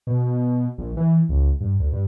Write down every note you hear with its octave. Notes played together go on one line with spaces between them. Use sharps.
B2
A#1
E3
C#2
G2
D2
G2